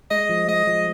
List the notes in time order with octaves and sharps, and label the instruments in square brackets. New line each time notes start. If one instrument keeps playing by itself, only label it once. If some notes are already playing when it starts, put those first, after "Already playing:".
[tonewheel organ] G#3 [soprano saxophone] D#5
[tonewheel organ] F3
[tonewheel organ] G#3 [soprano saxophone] D#5
[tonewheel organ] F3